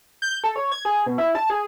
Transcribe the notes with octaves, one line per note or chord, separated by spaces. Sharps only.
G6
A4
C#5
G#6
G#4
B2
E4
A5
G#4